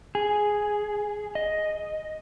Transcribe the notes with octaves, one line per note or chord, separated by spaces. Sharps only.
G#4
D#5